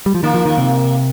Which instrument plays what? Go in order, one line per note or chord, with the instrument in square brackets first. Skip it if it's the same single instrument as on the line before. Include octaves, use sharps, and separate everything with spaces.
[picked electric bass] G3
F3
[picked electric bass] D#3 [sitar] A#3
[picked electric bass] F3
D#3
C3